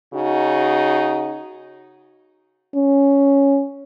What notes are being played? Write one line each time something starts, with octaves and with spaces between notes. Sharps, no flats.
C#3 D#4 F#4
C#4